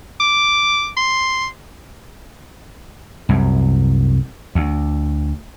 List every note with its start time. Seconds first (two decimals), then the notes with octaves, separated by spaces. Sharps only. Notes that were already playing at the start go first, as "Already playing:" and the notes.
0.20 D6
0.97 C6
3.29 C2 F#2
4.55 D2